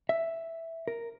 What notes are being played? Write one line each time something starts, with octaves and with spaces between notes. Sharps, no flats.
E5
A#4